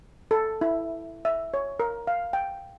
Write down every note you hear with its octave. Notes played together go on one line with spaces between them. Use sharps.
A4
E4
E5
C#5
A#4
F5
G5